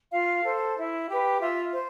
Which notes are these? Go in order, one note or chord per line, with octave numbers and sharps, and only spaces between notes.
F4 F5
A4 C5
E4
G4 B4
F4 E5
C5